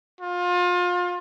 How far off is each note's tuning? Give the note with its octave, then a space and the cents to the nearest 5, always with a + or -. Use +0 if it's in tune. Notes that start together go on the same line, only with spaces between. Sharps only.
F4 +30